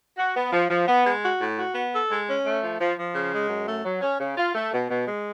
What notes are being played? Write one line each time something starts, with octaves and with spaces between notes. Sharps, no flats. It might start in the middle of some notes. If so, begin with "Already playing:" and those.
F#4
B3
F3
F3
B3
G#3
F#4
A2
F#4
B3
A4
G#3
C#4
A3
F3
F3
F3
C#3
G#3
F#2
A3
F#3
C#4
C#3
F4
A3
B2
B2
G#3